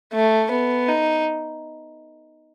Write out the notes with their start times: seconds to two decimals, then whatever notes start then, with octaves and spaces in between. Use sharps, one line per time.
0.13 A3
0.51 B3
0.89 D#4